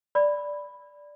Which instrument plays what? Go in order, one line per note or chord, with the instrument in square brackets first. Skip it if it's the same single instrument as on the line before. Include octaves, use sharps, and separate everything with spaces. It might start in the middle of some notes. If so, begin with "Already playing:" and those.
[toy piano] D5 B5